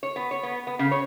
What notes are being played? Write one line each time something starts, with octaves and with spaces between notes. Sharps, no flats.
C#5
B3
C#5
B3
B3
C#3
C#5